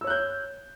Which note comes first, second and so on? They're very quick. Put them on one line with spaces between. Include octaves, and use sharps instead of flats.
E6 C#5 F#6 G6